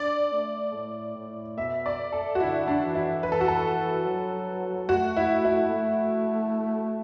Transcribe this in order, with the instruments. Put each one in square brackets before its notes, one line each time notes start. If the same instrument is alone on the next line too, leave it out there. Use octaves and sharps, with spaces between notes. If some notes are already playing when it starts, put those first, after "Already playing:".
Already playing: [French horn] D4 [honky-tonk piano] D5
[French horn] A3
A2
A2
[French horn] B2 [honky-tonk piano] E5
[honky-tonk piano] D5
A4
F#4
[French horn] D3 [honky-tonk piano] E4
[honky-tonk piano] D4
[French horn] E3
[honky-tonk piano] E4
[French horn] E3 [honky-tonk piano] B4
[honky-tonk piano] A4
F#4
A4
[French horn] F#3
[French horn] A3 [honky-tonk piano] F#4
[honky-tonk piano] E4
E4
[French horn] A3